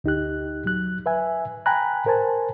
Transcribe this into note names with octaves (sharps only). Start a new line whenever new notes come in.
D2 D#4 G4 F#6
F#3 F#6
B4 E5 G#5
G5 G#5 A#5 B5 F#6
A#4 C5 G#5 A5